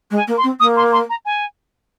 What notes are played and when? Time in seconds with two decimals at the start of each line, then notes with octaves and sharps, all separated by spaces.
0.10 G#3
0.16 G#5
0.27 A#3
0.38 C6
0.43 C4
0.60 A#3 D#6
0.77 C6
0.93 C6
1.10 A#5
1.25 G#5